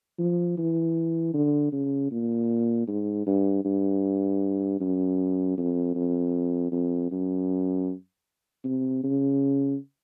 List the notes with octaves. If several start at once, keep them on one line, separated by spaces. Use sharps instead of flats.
F3
E3
D3
C#3
A#2
G#2
G2
G2
F#2
F2
F2
F2
F#2
C3
C#3